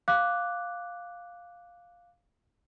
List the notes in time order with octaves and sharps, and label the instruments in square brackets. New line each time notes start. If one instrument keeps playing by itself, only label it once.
[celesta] F5 D6 F#6